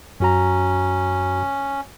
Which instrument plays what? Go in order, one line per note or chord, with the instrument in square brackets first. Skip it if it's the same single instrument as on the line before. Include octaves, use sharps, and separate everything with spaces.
[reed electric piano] F#2 F#4 A#5 [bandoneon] C#4